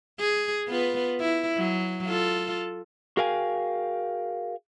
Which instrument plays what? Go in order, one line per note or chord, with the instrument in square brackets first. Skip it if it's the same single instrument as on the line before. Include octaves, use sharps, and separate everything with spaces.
[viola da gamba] G#4
B3 F4 B4
E4
F#3
F4 A4
[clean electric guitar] F#4 G#4 A#4 F5 G5 G#5